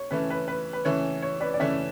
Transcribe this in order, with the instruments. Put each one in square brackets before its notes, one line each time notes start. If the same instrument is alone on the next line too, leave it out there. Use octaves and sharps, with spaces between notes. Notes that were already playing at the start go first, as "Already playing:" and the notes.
Already playing: [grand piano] C#5
[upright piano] C#3 E3 A3 C#4 [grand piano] B4
[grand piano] B4
B4
B4
[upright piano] C#3 E3 A3 C#4 [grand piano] C#5
[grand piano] C#5
B4 D5
D5
[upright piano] C#3 E3 A3 C#4 [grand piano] C#5 E5